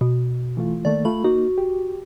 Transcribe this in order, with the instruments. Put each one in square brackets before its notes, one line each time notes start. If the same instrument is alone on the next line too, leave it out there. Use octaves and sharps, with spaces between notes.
[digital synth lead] B2
[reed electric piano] E3 A3 F4
[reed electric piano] D#3 A3 A#3 [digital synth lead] D5
[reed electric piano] A3 F4 [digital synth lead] B5
[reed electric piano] A#3 D#4 [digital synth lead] F#4
[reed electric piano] G4